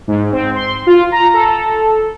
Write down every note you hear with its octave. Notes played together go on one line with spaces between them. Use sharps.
G#2
C4
C6
F4
A#5
A4